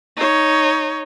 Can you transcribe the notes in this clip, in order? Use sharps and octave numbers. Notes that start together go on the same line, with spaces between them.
D#4 C#5